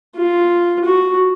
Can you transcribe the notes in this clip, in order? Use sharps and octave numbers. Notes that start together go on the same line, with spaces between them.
F4
F#4